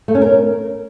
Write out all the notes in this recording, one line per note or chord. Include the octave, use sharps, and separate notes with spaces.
A3
C#4
A#4